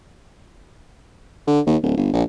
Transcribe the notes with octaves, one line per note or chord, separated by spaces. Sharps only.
D3
D#2
D1
G1
A#1